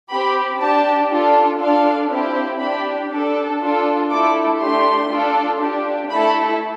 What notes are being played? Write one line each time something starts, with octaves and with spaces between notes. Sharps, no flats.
C4 G4 B5
D4 G4 A5
D4 F4 A4
D4 F4 A4 F5
C4 E4 G4
D4 G4 B5
D4 A4
D4 F4 A4
A3 E4 A4 D6
A3 D4 G4 C6
D4 F4 A4
D4 G4
A3 E4 A4 B5